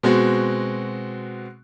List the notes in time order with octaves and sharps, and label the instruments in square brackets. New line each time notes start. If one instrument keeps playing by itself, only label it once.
[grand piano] B2 G#3 C4 F#4